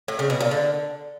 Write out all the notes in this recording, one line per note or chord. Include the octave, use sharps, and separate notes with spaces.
A2
C#3
B2
A#2
D3